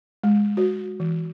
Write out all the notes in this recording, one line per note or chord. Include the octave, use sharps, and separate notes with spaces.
G#3
F#4
E3